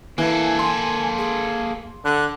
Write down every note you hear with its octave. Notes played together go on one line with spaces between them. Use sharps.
E3 A#3 A4 G#5
C6
G#4
D3 F#6